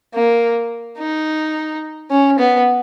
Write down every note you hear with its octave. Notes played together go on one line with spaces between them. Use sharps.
A#3
D#4
C#4
B3